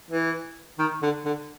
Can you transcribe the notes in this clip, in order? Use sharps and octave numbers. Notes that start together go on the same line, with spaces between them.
E3
D#3
D3
D3